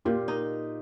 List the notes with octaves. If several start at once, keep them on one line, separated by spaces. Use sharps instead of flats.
A#2 F4 G4
D#4